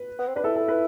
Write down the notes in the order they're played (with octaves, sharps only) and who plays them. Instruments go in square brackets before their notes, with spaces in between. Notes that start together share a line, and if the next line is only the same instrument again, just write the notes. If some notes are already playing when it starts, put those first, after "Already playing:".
Already playing: [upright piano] B4
[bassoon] B3
C4
[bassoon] D4 [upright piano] B4
[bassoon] E4 [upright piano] A4
[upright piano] A4
B4